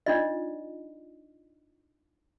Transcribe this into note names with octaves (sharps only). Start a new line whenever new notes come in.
D4 D#4 F4 D5 D#5